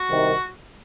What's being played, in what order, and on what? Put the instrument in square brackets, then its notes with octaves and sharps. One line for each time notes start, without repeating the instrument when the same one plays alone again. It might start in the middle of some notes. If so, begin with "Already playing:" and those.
Already playing: [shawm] F#4
[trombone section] C2 C3 D#3